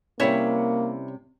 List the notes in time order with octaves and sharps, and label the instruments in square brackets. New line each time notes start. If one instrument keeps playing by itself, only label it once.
[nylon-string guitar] C3 G3 C#4 [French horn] A#3 [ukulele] E4 C#5